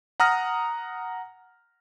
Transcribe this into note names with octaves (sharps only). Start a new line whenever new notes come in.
F#5 A#5 D#6 F6 A#6